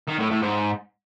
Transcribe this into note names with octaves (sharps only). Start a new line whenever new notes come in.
D#3
A2
A2
G#2